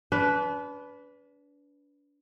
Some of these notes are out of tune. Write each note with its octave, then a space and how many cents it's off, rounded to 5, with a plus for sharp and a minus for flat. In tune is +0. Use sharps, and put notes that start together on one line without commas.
D4 -35 B4 +0